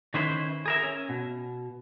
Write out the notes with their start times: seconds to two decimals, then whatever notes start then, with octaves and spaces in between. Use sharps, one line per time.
0.14 D#3 C#4 E4 B4 C5
0.66 G#4 A#4 E5
0.83 C#4
1.09 B2